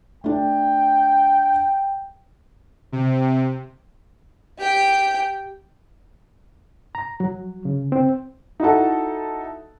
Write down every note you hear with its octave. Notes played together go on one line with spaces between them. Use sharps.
A3 D4 G5
C3
G4 G5
A#5
F#3
C#3
C4
D#4 E4 F#4 A4